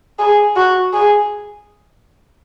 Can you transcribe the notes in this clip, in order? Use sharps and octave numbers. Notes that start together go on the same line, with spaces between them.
G#4
F#4
G#4